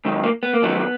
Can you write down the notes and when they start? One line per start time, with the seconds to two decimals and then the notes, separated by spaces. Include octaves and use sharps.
0.05 G#2 D#3 F#3
0.23 A#3
0.43 B3
0.54 A#3
0.62 F2 D#3 F#3 B3